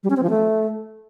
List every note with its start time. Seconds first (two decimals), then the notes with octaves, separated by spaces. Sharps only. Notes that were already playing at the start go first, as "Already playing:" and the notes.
0.03 G3
0.10 C#4
0.17 C4
0.23 F3
0.30 A3